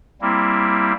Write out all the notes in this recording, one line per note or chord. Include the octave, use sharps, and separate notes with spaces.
G3 A#3 C4 E4